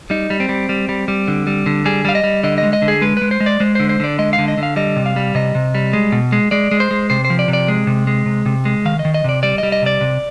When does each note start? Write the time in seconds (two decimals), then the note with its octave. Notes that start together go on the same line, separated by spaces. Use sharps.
0.10 G3 D#4
0.30 G3
0.40 C4
0.49 G3
0.69 G3
0.89 G3
1.08 G3
1.28 D3
1.47 G3
1.66 D3
1.85 G3 G#4
2.05 G3 F5
2.15 D#5
2.24 G3
2.43 D3 D#5
2.58 G#3 D#5
2.73 D#5
2.82 D3
2.88 G#4
3.02 G#3 B4
3.17 G#3 B4
3.31 C5
3.40 G#3
3.46 D5
3.60 G#3 C5
3.75 D3 C5
3.89 C5
4.00 D3 D5
4.19 G#3 D#5
4.33 F5
4.38 D3
4.48 D#5
4.57 D3
4.63 F5
4.76 G3 D#5
4.96 C3
5.06 F5
5.16 G3
5.35 C3 D#5
5.55 C3
5.75 G3
5.93 G#3
6.12 B2
6.32 G#3
6.51 G#3 D5
6.71 G#3
6.80 C5
6.91 G#3
7.10 C3 C5
7.25 C5
7.30 F3
7.39 D5
7.48 C3
7.53 D5
7.68 G#3
7.87 C3
8.07 G#3
8.26 C3
8.46 C3
8.65 G#3
8.85 D#3 F5
8.99 D#5
9.05 D#3
9.14 D#5
9.24 C3 D5
9.43 G3 D5
9.58 G3 D#5
9.72 D#5
9.82 C3 D5
10.01 C3